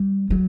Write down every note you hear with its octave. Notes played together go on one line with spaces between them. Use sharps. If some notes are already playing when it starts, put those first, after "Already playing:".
Already playing: G3
F#3